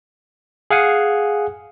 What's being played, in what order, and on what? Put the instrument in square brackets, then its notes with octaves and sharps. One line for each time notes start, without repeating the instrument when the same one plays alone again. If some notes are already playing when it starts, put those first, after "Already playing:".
[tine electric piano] G#4 F5 F#5 G#5